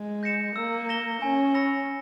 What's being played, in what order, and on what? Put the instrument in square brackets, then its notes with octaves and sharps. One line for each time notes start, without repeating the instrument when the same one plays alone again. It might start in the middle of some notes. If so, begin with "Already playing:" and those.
Already playing: [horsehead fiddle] G#3
[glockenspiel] G6 A#6 C#7 E7
[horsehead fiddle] A#3 [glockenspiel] E6
[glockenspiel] A#6 E7 G7
[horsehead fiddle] C#4 [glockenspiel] G#5
[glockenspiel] B5 E6 A#6 C#7